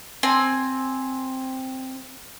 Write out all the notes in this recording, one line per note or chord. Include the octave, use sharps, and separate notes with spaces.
C4 G#5